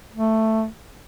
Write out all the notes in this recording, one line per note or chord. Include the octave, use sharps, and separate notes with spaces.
A3